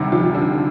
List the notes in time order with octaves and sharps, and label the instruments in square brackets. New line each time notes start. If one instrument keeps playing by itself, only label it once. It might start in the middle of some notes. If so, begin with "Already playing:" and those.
Already playing: [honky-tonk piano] D2 C3 D#3 G3 G4
F3 F4
D3 D4